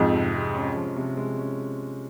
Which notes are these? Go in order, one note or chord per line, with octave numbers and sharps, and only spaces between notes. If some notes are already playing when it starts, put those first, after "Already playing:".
Already playing: F2 G#2 F3
C3
G#3
C#4
F3
C3
G#3
C#4